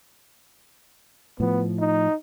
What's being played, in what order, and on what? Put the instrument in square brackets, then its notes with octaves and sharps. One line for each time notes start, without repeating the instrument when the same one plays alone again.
[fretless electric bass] A2 F3 [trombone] B3
[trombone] D#4